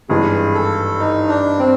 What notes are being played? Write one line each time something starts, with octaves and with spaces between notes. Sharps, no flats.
G#1 G2 E3 G#3 G#4
A4
D#4
D4
C4